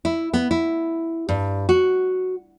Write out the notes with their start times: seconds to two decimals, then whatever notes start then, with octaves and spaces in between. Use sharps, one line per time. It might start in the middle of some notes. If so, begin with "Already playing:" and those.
0.05 E4
0.33 B3
0.51 E4
1.29 G2
1.69 F#4